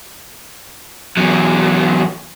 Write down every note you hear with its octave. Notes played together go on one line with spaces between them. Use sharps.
E2 F#3